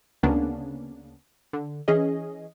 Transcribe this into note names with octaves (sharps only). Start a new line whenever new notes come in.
D2 C#3 A#3 B3 C#4 D4
D3
E3 C#4 G#4 D#5